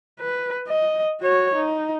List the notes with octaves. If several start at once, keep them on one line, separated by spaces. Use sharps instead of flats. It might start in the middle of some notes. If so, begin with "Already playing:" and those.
B4
D#5
F#4 C#5
D#4